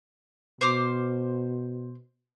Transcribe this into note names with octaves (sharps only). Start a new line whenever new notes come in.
B2 C5 D6 F6